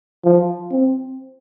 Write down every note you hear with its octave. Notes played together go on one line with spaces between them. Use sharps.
F3
C4